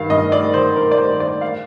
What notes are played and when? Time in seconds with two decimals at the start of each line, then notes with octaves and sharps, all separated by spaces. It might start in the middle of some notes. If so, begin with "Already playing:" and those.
Already playing: G2 D#3 F5
0.10 G2 D#5
0.32 D5
0.44 D#3
0.54 C5
0.76 G2 A#4
0.92 D5
0.98 C5
1.10 D#3
1.20 D5
1.41 F5